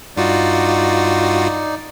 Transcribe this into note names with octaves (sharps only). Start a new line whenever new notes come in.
G2 D#4 F4 F#4 D5